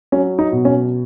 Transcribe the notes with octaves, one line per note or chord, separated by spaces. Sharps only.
F#3 C#4
D#4
B2
C#4